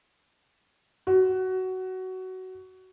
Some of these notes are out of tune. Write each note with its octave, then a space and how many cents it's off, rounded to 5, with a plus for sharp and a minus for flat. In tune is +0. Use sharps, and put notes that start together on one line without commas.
F#4 +15